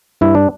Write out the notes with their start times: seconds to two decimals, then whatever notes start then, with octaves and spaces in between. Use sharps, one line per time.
0.21 G2 E4
0.35 D4